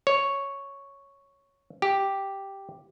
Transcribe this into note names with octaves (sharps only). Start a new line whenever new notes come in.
C#5
G4